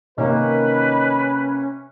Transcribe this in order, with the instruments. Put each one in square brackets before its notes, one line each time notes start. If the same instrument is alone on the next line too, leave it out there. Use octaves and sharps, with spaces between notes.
[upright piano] C3 A#3 [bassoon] D#3 [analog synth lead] C#4 [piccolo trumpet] B4